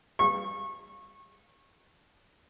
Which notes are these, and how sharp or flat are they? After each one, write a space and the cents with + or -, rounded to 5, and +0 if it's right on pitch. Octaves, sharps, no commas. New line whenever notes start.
C#6 -25